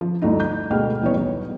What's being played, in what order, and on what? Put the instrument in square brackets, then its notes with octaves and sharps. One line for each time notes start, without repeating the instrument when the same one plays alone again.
[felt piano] F3
G1 D2 D3 D#4 E4
G6
D2 B2 G#3 A4 G5 F6
D#1 E3 B3 C#5
B1